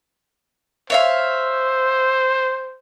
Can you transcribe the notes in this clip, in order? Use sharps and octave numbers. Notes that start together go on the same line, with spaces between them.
C5 C#5 E5 F5